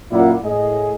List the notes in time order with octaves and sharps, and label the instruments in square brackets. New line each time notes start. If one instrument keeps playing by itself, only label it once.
[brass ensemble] F#2 A#2 A#3 E4 D5 F#5
A2 G#4 D#5